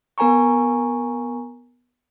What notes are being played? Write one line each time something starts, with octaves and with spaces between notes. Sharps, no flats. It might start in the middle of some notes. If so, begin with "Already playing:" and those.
B3 A#4 G#5 A#5 C#6